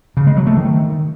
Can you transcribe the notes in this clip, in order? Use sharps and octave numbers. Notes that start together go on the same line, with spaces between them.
C#3
G#3
F#3
A3
D#3